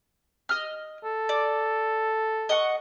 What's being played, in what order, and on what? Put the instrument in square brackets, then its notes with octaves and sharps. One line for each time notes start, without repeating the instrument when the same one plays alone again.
[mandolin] D#5 F6
[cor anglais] A4
[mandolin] D5
D#5 F#5 C#6